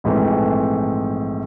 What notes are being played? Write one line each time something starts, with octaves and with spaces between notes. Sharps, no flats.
A#1 G#2 E3 A3 C4